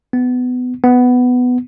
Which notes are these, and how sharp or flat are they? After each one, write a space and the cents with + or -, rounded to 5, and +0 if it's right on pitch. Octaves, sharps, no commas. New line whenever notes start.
B3 +20
B3 +10